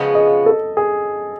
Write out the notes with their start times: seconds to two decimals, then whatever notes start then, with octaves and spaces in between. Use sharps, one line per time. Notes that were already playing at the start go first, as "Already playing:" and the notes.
Already playing: C#3 F3 G#3 B3
0.15 D#5
0.46 A4
0.77 G#4